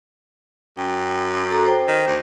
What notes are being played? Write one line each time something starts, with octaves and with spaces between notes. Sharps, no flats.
F#2 G5
F#4 A4 A#5
C5 G5
D#3
D2